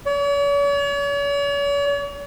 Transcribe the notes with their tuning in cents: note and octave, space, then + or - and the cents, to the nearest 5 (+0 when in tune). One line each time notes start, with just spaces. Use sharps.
C#5 +45